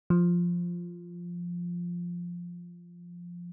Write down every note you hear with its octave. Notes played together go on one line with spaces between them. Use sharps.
F3